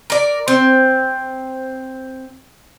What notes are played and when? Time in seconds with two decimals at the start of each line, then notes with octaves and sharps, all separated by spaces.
0.10 A#4 D5
0.48 C4